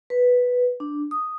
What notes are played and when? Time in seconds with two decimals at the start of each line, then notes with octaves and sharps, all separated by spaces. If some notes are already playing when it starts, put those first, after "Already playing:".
0.10 B4
0.80 D4
1.11 D#6